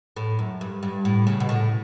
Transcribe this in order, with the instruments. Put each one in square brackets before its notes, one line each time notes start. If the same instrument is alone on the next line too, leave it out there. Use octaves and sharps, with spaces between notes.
[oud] A2
F#2
G2
G2
A2
C#3
B2
A2